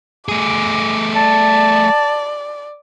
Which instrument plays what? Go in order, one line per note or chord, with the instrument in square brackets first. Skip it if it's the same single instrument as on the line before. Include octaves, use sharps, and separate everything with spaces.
[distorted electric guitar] A3 G#4 [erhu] D6
[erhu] D5 [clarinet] A5